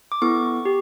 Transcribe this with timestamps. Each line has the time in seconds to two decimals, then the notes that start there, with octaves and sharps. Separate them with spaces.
0.12 D6
0.22 B3 E4 A4 C#6
0.65 G4